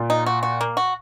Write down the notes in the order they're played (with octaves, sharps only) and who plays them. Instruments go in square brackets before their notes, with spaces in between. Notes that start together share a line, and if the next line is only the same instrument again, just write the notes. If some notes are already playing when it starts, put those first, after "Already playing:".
Already playing: [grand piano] A#2
[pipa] D#4
F#4
F#4
A#3
F#4